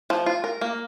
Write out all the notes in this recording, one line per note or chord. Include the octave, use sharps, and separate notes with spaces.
F3
F4
A#4
A#3